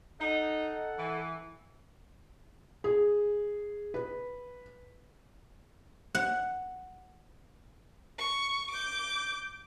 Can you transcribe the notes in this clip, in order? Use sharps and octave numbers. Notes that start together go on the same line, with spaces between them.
D#4 A4 F#5
E3
G#4
B4
F#5
C#6
D6 G6